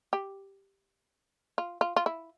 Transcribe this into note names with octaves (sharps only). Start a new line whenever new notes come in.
G4
F4
F4
F4
E4